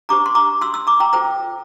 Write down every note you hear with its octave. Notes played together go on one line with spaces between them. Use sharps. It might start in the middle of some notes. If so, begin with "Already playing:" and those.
D4 G4 C5 A#5 D6
C6
A#5 D6
C6 E6
C6 E6
A#5 D6
G5 A#5
F4 A4 C5 G5 A#5